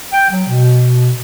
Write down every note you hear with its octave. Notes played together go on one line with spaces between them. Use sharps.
G5
F#3
B2